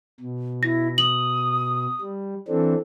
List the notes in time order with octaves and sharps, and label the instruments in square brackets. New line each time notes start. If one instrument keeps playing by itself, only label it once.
[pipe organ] B2
[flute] E4 [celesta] A#6
[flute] D#6 [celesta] F#7
[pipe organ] G3
[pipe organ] E3 C4 D4 [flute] A4